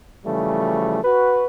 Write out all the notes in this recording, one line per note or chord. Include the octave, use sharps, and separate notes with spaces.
C#3 E3 F3 G3 A3
F#4 B4